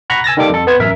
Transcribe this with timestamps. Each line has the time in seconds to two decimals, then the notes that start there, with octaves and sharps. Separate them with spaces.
0.10 F#5 A#5 B5 C#6 F#6
0.24 G#5 E6 A6 A#6
0.37 D#3 G3 A#3 A4 D6
0.50 F2 A4
0.67 B3 B4 C5 G#6
0.79 A1 F#2 A#4 E5